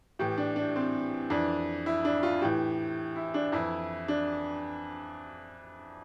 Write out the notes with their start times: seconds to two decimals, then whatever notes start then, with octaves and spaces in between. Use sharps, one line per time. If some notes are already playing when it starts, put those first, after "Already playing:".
0.19 A2 E3 G4
0.38 D4
0.56 D4
0.76 C4
1.30 F2 E3 D4
1.86 E4
2.05 D4
2.23 F4
2.42 A2 E3 G4
3.16 E4
3.34 D4
3.52 F2 E3 E4
4.08 D4